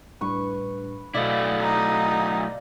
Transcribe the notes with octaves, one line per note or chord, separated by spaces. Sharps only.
A2 G3 D4 B4 C#6
B2 F#3 A3 E4 D5 D#5 F5
D#4